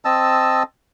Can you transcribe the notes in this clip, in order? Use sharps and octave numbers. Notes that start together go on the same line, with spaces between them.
C4 D#5 A5 E6